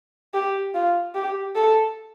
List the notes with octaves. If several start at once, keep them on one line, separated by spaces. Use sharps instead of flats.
G4
F4
G4
A4